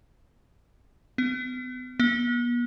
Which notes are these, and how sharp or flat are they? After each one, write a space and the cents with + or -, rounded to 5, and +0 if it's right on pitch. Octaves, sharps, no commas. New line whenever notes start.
B3 +40
B3 -40